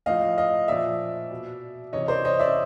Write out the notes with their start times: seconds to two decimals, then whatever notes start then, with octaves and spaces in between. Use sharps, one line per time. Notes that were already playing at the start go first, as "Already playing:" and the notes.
0.06 A2 F3 D#5 F5
0.38 D#5 F5
0.68 A#2 F3 D5 E5
1.31 B2
1.93 C3 E3 C#5 D#5
2.08 C5 D5
2.25 C#5 D#5
2.39 D5 E5